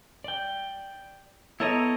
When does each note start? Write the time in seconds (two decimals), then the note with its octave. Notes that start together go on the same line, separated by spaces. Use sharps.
0.24 D5 G5
1.60 B3 E4 A4 C#5 D#5 A#5